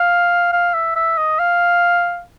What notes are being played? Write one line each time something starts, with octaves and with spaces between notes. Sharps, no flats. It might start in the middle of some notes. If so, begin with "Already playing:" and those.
Already playing: F5
F5
E5
E5
D#5
F5